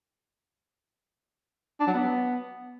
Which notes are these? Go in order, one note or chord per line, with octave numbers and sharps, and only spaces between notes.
D4
F#3
B3